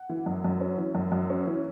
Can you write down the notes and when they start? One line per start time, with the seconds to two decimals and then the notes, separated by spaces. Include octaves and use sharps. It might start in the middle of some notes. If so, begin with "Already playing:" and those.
Already playing: F#5
0.09 E3
0.26 F#2
0.44 F#2
0.60 C#4
0.78 E3
0.95 F#2
1.12 F#2
1.30 C#4
1.47 E3